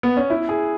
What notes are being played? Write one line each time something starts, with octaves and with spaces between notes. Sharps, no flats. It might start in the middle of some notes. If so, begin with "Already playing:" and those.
B3
C#4
E4
G#4